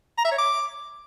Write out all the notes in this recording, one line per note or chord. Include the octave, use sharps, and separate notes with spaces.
A#5
E5
C#5
D6